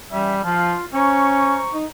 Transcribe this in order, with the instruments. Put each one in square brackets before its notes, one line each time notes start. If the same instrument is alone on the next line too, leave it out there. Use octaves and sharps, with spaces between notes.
[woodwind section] E3 C#4 E5 [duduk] G3
[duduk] F3 [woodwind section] F4
[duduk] C#4 [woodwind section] C5 A#5 C#6
[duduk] D#4